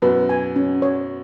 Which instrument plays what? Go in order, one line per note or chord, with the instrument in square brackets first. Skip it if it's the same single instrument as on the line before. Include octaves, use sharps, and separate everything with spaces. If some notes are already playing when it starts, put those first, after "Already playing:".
[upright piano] F#2 B2 [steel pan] B4
[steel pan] G#5
C#4
C#5